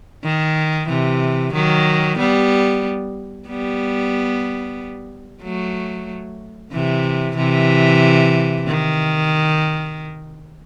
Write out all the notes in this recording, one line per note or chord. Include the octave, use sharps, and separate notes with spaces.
D#3
C3 E3
D#3 F#3
G3 B3
G3 B3
F#3 A3
C3 E3
C3 E3
D#3